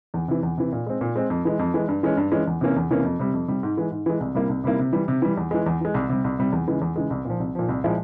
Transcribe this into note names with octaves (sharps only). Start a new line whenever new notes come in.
E2
C3 E3
E2
C3 E3
A#2
G#3 C4
A#2
G#3 C4
F2
E3 G#3
F2
E3 G#3
G2
E3 G#3 C#4
G2
E3 G#3 C#4
E2
C3 E3 A#3 C#4
E2
C3 E3 A#3 C#4
F2
C3 G3
F2
C3 G3
G#2
E3 G#3
G#2
E3 G#3
C2
C3 G3 A#3 E4
C2
C3 G3 A#3 E4
C3
E3 G3
C3
E3 G3
E2
E3 G#3
E2
E3 G#3
C2
C3 G3
C2
C3 G3
E2
C#3 E3 G#3
E2
C#3 E3 G#3
C2
A#2 F3
C2
A#2 F3
C2
A#2 F3 G#3 E4